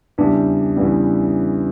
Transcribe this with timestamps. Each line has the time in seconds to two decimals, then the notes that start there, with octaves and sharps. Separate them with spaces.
0.18 E2 C#3 E3 G3 D4
0.77 E2 C#3 E3 G3